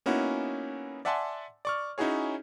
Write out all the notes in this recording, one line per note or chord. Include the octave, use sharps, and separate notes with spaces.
A#3 B3 C#4 D#4 E4 F#4
D5 E5 F#5 G#5 A5 C6
D5 C#6 F6
C#4 D#4 E4 F#4 G#4 C#5